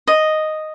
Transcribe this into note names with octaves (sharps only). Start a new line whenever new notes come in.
D#5